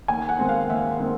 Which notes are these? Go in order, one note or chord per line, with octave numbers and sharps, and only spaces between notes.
D#2 G#5
F#5
D#3 G#3 C4
F5
D#2 E5
D#3 G#3 C4